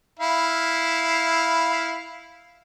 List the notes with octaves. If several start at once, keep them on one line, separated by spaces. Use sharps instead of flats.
E4 F5